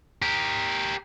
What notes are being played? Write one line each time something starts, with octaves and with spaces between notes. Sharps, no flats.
G4 A#4